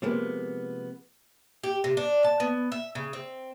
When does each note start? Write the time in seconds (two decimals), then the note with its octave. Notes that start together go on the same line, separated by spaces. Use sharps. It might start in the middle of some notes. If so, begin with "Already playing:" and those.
0.02 C3 F3 G#3 A#3 B3
1.63 G4
1.84 C3
1.97 D4
2.24 A5
2.40 B3
2.72 E5
2.95 C#3
3.13 C4